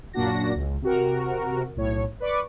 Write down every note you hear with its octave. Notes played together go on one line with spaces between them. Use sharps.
F#2 A#2 A#3 D4 F#4 A#6
C#2
C3 F#4 A#4
B1 A2 C#5
B4 D5 C#6 D6